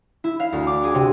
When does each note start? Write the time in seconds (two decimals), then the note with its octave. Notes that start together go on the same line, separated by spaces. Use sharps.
0.24 E4
0.40 F5
0.52 D2
0.67 D6
0.83 G#4
0.94 C3